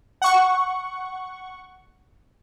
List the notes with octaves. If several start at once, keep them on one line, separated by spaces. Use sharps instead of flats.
F#5 C#6